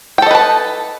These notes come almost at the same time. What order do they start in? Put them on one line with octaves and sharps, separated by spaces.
G5 A4 D#5 B4 A5